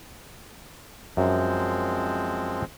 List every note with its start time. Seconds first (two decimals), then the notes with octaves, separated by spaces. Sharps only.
1.17 F#2 F3 G#3 C4